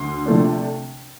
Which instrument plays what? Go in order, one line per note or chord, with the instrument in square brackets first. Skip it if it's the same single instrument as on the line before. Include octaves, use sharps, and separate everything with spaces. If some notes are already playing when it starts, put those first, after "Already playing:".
Already playing: [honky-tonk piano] D2 C6
C3 F3 A3 D4